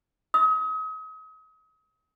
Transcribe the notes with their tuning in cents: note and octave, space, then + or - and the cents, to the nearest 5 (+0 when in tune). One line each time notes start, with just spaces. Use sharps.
D#6 +35